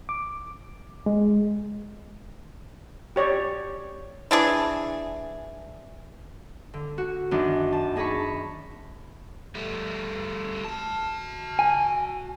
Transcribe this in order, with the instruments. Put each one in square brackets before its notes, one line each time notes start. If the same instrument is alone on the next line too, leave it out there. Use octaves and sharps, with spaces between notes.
[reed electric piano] D6
G#3
[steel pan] G4 C#5 D5
[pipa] E3 D4 G#4
[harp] D3
F#4
F#2 D#3 D4
A5
D4 D#4 G#4 A5 B5 C#6
[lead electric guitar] G3 A3
F#4 A5
[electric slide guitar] G#5